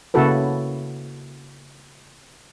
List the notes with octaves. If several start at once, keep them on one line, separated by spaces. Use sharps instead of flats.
C#3 A#3 E4 F#4 A4 B4